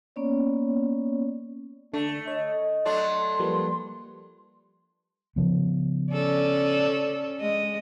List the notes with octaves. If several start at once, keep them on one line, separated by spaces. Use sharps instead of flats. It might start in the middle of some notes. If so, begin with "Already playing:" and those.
A#3 B3 C#4 C#5 D5
D3 A3 D4
C#5 D#5
F#3 A3 D4 A5 C6
F3 G3 A#3 B4
C#3 F3 B3
C#4 A4 D5
G#3 D#5